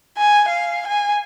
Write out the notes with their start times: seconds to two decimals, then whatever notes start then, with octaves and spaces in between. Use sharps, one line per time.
0.18 G#5
0.48 F5
0.87 G#5